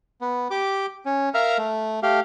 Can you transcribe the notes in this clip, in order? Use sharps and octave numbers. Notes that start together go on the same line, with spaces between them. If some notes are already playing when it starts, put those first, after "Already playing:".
B3
G4 D6
C#4
A#4 E5 F5 A#5
A3
A3 G4 F5